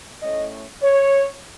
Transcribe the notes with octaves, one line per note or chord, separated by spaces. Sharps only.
A2 A3 C#4 D#5
C#5